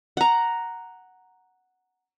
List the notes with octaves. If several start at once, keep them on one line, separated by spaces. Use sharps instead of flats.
F#5 A#5